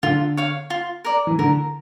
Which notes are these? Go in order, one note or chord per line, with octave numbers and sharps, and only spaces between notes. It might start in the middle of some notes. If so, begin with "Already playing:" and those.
D3 F4
C#5 F5
F4
A#4 D5
E3
D3 A#4